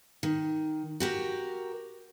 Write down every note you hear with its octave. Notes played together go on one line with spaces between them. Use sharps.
D#3
F#4 G4 A#4